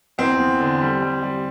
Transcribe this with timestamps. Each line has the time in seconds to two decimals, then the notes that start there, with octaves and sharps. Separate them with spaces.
0.18 E2 C4
0.40 E2
0.60 D3
0.81 G3
1.02 G3
1.22 G3